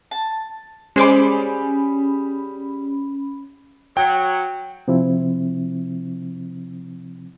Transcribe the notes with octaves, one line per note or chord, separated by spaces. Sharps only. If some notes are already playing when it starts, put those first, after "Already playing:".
A5
G3 G#3 C#4 G#4 C5 B5 D6
F#3 G5
C3 F3 C4 E4